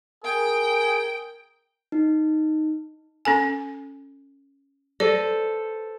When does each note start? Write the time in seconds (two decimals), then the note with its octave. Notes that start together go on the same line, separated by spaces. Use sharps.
0.24 G#4 A#4 G5
1.92 D#4
3.25 C#4 A4 G#5
5.00 A4 B4 C5 D5